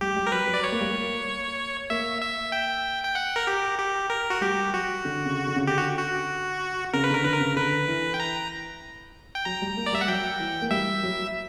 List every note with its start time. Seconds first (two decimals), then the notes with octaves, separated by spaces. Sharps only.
0.01 G3 G4
0.16 G3
0.27 A#4
0.32 F#3 B4
0.48 F#3
0.54 D5
0.64 C#5
0.72 A#3
0.81 G3
0.89 A#3
1.90 A#3 E5
2.22 E5
2.52 G5
3.04 G5
3.15 F#5
3.36 A#4
3.47 G4
3.79 G4
4.10 A#4
4.30 F#4
4.41 G3 G4
4.73 F#3 F#4
5.05 D3
5.25 C#3
5.47 D3
5.56 C#3
5.67 D3 G4
5.78 F#4
5.98 F#4
6.93 C#3 A#4
7.04 B4
7.09 D3 A#4
7.24 D3 B4
7.34 A#4
7.40 C#3
7.56 D3 B4
7.88 E3
8.14 G5
8.20 A#5
9.35 G5
9.45 F#3 A#5
9.62 G3
9.77 A#3
9.86 D5
9.93 G3 E5
10.01 F#5
10.08 F#3 G5
10.40 E3
10.62 A#3
10.71 G3 E5
11.03 F#3